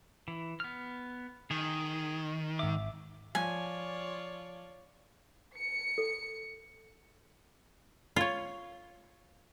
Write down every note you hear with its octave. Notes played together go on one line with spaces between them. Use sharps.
E3
B3 F6
D#3 G#4
G#1 E5 D6
F3 F4 C#5 D5 G#5
C#7
A4
F4 C#5